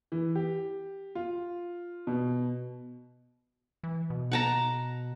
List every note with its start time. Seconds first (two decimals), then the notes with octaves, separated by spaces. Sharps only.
0.12 E3
0.35 G4
1.15 F4
2.07 B2
3.83 E3
4.10 B2
4.32 F#5 A5 A#5